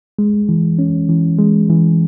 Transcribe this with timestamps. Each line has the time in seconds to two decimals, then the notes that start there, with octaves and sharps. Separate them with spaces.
0.19 G#3
0.49 E3
0.79 C#4
1.09 E3
1.39 G#3
1.69 E3